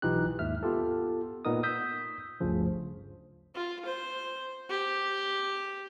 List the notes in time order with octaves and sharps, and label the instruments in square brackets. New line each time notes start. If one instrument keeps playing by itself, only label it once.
[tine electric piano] B1 E3 D#4 F4 G4 F#6
D#2 G#2 E5 F6
B3 F4 G4 A4
A#2 B3 D#4 A#4 D#5 D#6
D#6 E6 G6 B6
G1 D2 G2 C#3 F3
[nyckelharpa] F4
C5
G4